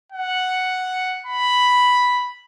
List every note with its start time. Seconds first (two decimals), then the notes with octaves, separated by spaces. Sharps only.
0.12 F#5
1.26 B5